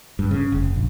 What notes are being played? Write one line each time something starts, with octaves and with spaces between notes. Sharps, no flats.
G2
C#3
F1
A#1